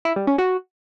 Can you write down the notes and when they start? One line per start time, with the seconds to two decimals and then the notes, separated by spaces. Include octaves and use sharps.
0.05 E4
0.16 G3
0.27 C#4
0.38 F#4